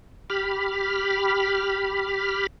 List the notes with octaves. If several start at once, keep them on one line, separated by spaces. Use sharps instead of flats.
G4 B5 F6